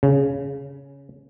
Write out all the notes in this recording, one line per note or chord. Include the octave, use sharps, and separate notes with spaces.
C#3